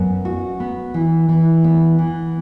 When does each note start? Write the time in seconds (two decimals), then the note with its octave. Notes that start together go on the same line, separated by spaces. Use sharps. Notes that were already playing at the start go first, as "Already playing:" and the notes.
Already playing: F#2 B3
0.25 F#4
0.60 B3
0.94 E3
1.29 E3
1.64 B3
1.99 E3